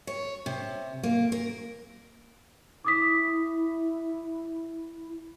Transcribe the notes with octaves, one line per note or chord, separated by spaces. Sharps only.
C#5
C3
A#3
A#4
E4 D6 D#6 B6